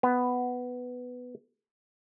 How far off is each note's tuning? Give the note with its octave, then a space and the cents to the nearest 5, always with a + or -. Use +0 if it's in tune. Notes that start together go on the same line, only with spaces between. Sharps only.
B3 +5